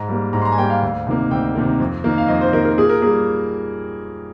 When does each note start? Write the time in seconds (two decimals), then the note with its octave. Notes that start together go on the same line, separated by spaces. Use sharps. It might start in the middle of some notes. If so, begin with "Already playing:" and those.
Already playing: G#2 A#5
0.08 G3 A#3
0.33 G#2 A#5
0.42 C6
0.45 A#5
0.52 G#5
0.57 G3 A#3 G5
0.70 F5
0.82 D2
1.07 C3 D#3 A#3
1.31 D2 G5
1.55 C3 D#3 A#3
1.80 F2
2.04 D#3 A#3
2.18 F5
2.28 F2 D#5
2.41 C5
2.53 D#3 A#3 A#4
2.65 A#4
2.78 A#2 G#4
2.89 A#4
3.02 A#3 G#4
3.06 G3